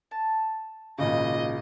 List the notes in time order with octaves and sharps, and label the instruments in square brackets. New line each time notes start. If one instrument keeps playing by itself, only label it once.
[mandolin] A5
[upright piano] G#1 A#2 C#3 [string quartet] D#5